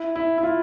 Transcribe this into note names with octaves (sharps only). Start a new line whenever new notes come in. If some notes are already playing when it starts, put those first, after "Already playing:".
Already playing: E4
E4
E4
F4